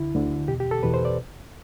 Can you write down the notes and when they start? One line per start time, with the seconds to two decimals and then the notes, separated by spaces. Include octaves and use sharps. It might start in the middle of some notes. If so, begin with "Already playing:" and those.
Already playing: D2 D3 E4
0.15 D2 D3
0.48 E2 B2 G4
0.60 G4
0.71 A4
0.83 E2 B2 B4
0.94 C5
1.05 D5